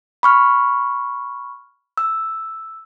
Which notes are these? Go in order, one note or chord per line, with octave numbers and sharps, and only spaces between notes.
B5 C#6 F6
E6